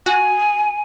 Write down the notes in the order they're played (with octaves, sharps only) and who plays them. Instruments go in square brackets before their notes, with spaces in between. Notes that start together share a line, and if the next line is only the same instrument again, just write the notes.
[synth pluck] F#4 [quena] G#5